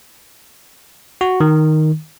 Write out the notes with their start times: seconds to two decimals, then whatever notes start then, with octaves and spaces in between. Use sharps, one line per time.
1.21 F#4
1.40 D#3